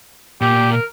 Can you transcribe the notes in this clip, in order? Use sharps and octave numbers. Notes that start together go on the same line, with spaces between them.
A#2 G4
A#4